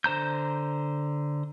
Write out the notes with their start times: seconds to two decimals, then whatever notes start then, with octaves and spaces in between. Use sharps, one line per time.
0.04 D3 C5 A#5 G6